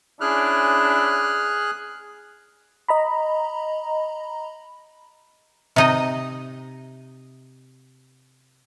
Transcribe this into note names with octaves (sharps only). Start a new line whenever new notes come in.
C#4 D4 E4 G#4 F6 F#6
D#5 A#5 B5
C3 D#4 D#5